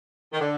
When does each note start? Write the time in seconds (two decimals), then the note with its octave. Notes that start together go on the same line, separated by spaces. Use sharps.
0.33 D#3
0.40 D3